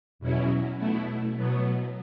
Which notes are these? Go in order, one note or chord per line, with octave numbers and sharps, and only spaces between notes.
E2 B2 F#3 C#4 E4
B2 A3 E4
B2 F#3 B3